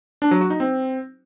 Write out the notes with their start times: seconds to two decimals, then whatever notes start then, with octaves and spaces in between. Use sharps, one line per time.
0.22 D4
0.31 F#3
0.41 F#4
0.50 D#4
0.60 C4